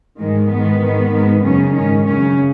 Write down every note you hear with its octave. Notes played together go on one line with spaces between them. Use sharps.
G#2 D#3 G#3
G#2 D#3 B3
G#2 D#3
G#2 D#3
F#2 C#3 C#4
G#2 D#3 C#4
F#2 C#3 C#4